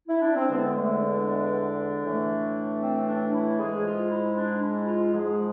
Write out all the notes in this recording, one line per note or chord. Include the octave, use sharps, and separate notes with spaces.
E4
D4
C4
E2 D3 G#3 B3
A3
D4
A2 E3 A3
C4
D4
E4
G#2 G#3 G#4
F4
E4
D4
E4
F4
G#2 F3 G#3 G#4